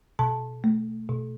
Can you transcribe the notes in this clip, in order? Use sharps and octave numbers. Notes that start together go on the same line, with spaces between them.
B2 A5
A3
B2